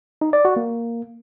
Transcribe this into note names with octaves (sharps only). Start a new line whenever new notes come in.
D#4
D5
F#4
A#3